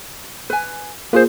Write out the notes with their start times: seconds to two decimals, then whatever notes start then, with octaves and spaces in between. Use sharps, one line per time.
0.50 B4 G#5
1.13 A#3 F4 G#4 B4 C5